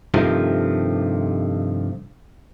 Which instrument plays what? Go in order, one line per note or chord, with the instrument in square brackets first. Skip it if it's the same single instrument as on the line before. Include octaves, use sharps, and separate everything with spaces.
[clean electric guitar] G2 C3 D#3 F3 A3